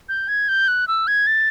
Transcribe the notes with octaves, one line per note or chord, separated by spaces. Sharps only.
G6
G#6
G6
F#6
E6
G#6
A6